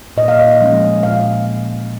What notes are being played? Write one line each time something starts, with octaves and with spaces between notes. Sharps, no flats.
A#2 D#5
F5
D#5
F3 G#3 C#4
A#2 F5